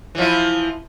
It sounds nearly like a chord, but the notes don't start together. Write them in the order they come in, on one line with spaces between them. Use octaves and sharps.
E3 F3 E4